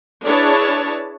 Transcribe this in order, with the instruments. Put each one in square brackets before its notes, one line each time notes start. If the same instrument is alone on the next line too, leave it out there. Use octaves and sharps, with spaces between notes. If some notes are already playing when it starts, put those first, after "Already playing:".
[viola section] D4 E4 G#4 B4 C#5 A5